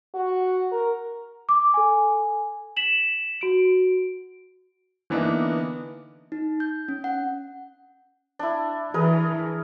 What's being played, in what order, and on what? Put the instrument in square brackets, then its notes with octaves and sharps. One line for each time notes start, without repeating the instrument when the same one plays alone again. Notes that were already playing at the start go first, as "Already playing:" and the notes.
[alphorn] F#4
A#4
[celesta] D6
A4 G#5
B6 E7 F#7
F#4 D7
[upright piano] D3 E3 A#3 B3 D4 D#4
[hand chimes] D#4
G6
C#4
F#5
[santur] D4 E4
[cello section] E3 [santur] G#4 A#4 B4